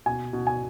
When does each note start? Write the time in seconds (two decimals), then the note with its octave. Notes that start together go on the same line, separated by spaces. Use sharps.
0.06 B2 G#5
0.33 B2
0.47 G#5